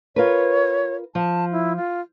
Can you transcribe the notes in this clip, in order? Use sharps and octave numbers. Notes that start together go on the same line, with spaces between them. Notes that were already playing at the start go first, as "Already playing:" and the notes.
F4 A#4 B4 C#5
F3 A5
E4
F4